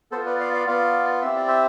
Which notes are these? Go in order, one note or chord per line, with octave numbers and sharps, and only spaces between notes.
B3 F4 A4 C5
B4 D5
D5 F5
D5 F5
B3 F4 D5 F5
C4 E4 G4 E5
D5
C5 E5